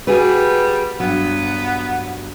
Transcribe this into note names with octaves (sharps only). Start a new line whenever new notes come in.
G3 F#4 G#4 B4
G2 F#3 B3